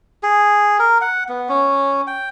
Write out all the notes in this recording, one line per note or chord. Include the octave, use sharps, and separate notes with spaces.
G#4
A#4
F#5
B3
C#4
G5